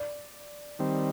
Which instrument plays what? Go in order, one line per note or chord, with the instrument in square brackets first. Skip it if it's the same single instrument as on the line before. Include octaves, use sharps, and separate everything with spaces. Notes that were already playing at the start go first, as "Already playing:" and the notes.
Already playing: [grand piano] D5
[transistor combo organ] D#3 G3 C4